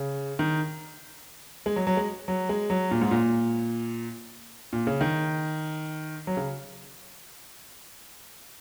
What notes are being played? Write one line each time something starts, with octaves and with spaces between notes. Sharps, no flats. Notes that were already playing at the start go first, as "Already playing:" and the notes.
Already playing: C#3
D#3
G#3
F#3
F#3
G#3
F#3
G#3
F#3
A#2
G#2
A#2
A#2
C#3
D#3
F#3
C#3